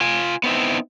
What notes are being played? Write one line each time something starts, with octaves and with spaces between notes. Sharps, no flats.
F4 G#5
B3 C4 D#4 E4